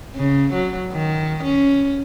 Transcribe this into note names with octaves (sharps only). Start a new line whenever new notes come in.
C#3
F#3
D#3
C#4